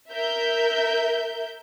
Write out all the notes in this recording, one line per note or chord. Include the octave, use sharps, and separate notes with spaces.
A#4 E5 G6